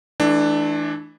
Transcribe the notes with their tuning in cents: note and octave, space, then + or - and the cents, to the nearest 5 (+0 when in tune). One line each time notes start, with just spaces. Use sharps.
E3 -10 A3 -30 D4 +15